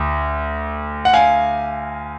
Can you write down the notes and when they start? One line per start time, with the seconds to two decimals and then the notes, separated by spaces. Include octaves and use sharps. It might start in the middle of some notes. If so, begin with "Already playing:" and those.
Already playing: D2
1.05 F#5
1.13 F5 G#5